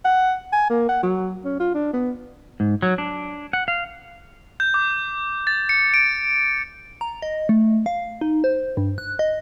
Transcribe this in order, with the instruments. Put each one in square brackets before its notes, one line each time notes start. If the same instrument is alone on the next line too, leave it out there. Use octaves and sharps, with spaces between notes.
[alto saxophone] F#5
G#5
A#3
F#5
F#3
C#4
F4
D4
B3
[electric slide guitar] G#2
F#3
D4
F#5
F5
[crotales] G6
D6
A6
C#7
D7
[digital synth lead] A#5
D#5
A3
F5
D#4
C5
G2
F#6
D#5